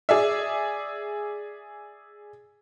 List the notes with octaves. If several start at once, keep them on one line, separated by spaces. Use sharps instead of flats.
G#4 D5 E5